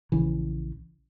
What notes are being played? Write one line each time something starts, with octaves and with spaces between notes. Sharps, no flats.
A#1 C#3 E3